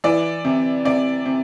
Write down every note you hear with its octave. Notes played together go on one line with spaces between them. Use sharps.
E3 D5
C3
C3 D5
C3